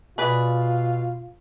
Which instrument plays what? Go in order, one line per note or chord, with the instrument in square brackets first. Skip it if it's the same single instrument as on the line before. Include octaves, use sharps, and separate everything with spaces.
[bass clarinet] B2 [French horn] F4 [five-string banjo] G#4 B4 D5